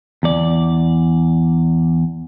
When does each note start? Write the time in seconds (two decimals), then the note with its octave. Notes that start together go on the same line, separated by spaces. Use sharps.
0.23 E2 D5